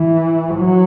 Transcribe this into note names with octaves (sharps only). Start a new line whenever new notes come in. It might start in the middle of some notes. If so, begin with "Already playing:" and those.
Already playing: E3
F#3